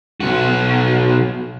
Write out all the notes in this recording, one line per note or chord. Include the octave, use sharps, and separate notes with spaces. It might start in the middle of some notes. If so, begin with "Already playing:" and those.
B1 F#4